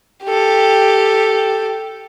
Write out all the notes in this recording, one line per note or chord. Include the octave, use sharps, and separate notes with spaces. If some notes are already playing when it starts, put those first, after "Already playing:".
G4 A4